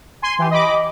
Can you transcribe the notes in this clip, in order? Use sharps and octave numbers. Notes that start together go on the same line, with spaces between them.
G#5 C6
E3 G4
D#5 B5 D6